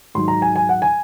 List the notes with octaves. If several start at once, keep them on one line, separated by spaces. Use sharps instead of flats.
G#2 D#3 F#3 C6
A#5
G#5
G#5
F#5
G#5